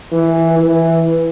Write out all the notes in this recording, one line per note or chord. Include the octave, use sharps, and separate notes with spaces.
E3
E3